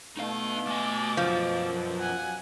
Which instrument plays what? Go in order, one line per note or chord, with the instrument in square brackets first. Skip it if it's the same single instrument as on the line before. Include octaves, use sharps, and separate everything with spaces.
[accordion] B2 [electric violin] A3 [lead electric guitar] D#4 F5
[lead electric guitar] A3 G#5 [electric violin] D6 A6
[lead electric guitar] F#2 [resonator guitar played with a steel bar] F3
[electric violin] F#5 G#5